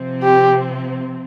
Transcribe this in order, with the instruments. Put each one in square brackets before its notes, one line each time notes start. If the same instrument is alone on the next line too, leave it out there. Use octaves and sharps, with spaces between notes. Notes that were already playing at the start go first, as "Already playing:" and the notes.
Already playing: [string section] C3 F3 C4
[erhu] G4